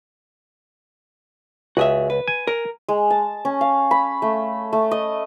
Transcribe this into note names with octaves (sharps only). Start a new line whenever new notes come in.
C#2 F#4 G#4 E5
B4
G#5
A#4
G#3
A5
C#4
F5
B5
A3
A3
D#5